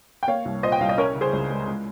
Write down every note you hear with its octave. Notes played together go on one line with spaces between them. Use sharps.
G5
A#3 C#5 F5
C2
A#2 C5 D#5
G5
C2 F5
D#5
C#4 A#4 C#5
C#3
G#4 C5
C#2
G#3
G#3